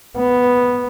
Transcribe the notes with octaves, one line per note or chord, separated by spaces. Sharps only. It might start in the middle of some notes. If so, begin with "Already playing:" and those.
B3